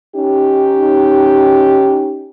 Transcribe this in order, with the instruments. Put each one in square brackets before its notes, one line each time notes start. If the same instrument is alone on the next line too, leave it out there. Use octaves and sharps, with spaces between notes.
[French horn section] C#4 D#4 G4